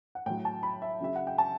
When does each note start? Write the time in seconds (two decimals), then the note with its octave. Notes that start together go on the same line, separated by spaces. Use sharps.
0.15 F#5
0.26 A2 F#3 G5
0.45 A5
0.63 B5
0.82 E5
1.01 C#3 F#3 E5
1.16 F#5
1.27 G5
1.38 A5